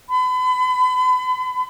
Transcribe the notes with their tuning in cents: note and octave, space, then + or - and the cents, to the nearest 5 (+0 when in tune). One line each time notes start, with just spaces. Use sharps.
B5 +40